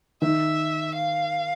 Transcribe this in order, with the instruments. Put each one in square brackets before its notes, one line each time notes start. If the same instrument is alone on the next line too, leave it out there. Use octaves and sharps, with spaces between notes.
[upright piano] D#3 [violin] E5
[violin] F5